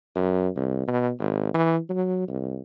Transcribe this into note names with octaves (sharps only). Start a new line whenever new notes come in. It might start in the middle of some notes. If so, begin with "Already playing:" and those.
F#2
C2
B2
G#1
E3
F#3
C2